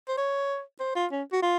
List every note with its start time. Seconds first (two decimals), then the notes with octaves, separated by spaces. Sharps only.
0.08 C5
0.17 C#5
0.80 C5
0.95 F4
1.11 C#4
1.32 F#4
1.42 F4